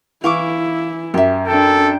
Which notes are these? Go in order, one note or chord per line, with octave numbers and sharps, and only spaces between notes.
E3 E4 F5 C#6 D6
F#2 G4 E5
D4 A4 G5